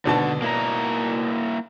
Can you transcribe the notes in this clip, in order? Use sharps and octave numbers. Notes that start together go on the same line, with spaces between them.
G#1 B2 D3 A5
A#3 E4 A#5